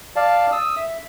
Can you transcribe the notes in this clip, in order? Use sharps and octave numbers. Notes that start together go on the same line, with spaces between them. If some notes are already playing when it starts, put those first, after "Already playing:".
D5 F5 A5
D#6 E6
E5